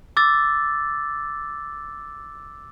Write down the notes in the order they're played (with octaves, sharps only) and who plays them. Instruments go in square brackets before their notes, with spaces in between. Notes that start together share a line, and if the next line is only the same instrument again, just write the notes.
[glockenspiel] D6 E6 A6